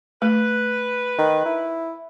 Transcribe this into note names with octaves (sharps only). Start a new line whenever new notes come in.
A3 B4
D#3
E4